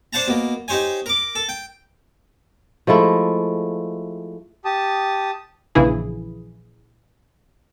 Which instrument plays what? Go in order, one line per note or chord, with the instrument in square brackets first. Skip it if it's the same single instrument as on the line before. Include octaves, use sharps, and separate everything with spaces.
[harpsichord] D4 C5 F#5 A5 A#5
B2 A#3
D#4 G4 C5 C#5 G#5
A#4 D6
A4
G5
[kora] F3 G#3 A3 E4
[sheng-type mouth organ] G4 A5 D#6
[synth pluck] A#1 C#3 E3 E4 G#4